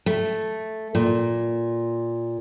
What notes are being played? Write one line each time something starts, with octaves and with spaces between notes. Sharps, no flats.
A3
A#2